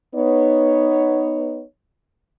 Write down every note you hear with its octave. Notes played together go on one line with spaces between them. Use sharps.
B3 D#4 C#5